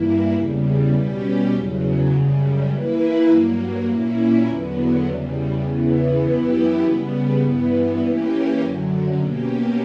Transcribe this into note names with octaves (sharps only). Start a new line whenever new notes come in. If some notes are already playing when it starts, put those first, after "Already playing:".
Already playing: G2 E3 A#3 E4
E2 C#3 G3
B2 G3 C#4 G4
E2 C#3 F#3
F#2 C#3 G3
E3 A#3 E4 B4
G2 F#3 A#3
A#2 A#3 C#4 E4
E2 D3 F#3 B3
E2 C#3 G3
E2 C#3 E3 B3
F#2 E3 B3 E4 G4
C#3 G3 B3
G2 E3 B3
E3 A#3 C#4 G4
F#2 D3 F#3
B2 A#3 C#4 G4